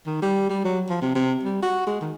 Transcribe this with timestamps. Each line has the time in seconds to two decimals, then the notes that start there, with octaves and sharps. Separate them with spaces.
0.06 D#3
0.22 G3
0.49 G3
0.65 F#3
0.89 F3
1.02 C3
1.15 C3
1.43 G3
1.63 F#4
1.87 G#3
2.01 D#3